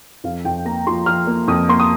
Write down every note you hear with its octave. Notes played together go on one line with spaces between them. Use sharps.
F2 F5
F2 G5
A#3 A#5
F3 C6
F3 F6
A#3
F2 D#6
A#3 C6
D#6